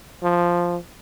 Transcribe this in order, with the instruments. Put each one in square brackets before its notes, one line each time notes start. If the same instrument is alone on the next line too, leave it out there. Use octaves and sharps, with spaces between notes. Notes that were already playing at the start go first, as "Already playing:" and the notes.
[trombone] F3